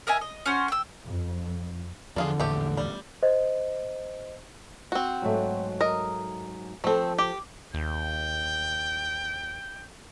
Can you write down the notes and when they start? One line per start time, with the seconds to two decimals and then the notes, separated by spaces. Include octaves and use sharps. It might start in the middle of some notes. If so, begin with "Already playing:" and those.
0.07 A#4 D#5 E5 G#5
0.21 D#5
0.46 C#4 F#4 C5
0.68 G5 E6
1.08 F2
2.16 E2 D3 F3 D4 F4 G#4
2.40 A#1 E2 A2 A3 G4
2.77 G3
3.23 C5 D#5
4.92 C4 F#4
5.22 G#2 F#3 A3
5.81 A#4 D#5
6.84 F3 A3 C4 A4
7.18 G4
7.74 D#2 G5